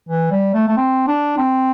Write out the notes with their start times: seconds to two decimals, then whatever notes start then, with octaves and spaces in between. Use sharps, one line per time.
0.09 E3
0.31 G3
0.54 A3
0.68 A3
0.77 C4
1.07 D4
1.38 C4